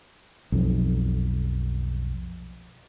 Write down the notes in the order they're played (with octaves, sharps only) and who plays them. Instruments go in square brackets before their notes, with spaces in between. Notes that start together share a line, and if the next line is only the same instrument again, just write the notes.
[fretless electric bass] B1 F2